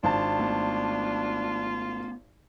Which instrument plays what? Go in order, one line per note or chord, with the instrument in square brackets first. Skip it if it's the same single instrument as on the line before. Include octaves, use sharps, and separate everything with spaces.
[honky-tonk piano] G#1 A5 [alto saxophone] D4 [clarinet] F4
[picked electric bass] A3 B3